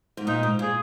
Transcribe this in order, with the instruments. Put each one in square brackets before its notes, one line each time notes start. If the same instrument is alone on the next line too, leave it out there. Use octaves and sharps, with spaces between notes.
[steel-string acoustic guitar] G#2
[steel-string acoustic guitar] A#2 [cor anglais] D#4
[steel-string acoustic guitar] G#2
[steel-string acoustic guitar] A#2 [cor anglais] G#4